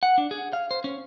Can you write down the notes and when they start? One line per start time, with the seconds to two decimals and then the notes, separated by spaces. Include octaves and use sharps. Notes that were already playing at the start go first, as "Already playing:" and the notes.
0.03 F#5
0.18 D4
0.31 G#4
0.53 F5
0.71 C5
0.84 C#4